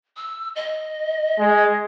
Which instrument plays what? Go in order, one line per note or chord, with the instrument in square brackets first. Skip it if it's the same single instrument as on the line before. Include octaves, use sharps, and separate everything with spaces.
[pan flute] E6
D#5
[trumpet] G#3